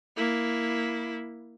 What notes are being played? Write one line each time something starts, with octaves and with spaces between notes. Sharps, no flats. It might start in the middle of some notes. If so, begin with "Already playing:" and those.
A#3 E4